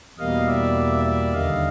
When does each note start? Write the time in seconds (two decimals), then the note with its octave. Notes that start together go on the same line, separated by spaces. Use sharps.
0.18 E2 B2 G3 A#3 D#5 F5
0.47 D5 E5
1.04 D5 E5
1.33 D#2 D3 G3 D#5 F5